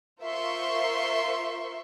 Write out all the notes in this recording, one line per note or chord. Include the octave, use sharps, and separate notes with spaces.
F4 A#4 C5 E5 C6 C#6